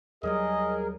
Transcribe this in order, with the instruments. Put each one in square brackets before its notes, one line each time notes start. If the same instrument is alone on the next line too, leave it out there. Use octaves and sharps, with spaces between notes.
[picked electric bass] D#2 F#3 G3 [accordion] G#4 A#4 [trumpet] D#5